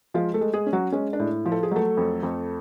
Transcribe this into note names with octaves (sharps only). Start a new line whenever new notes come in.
F3 G#3 F4
A3 A4
G#3
G#3 G#4
C#4
F#3 F#4
G#3 C#4
D4
A2
F3
A4
G#4
F#3 A3 A4
F2
F2